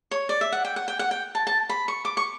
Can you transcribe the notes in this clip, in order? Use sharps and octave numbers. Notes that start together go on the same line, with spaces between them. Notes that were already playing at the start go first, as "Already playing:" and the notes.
C#5
D5
E5
F#5
G5
F#5
G5
F#5
G5
A5
A5
B5
C#6
D6
C#6